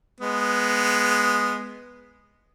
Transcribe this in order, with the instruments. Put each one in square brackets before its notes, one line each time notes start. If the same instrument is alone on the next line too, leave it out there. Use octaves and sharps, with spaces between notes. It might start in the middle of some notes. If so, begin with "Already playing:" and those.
[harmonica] G#3 B3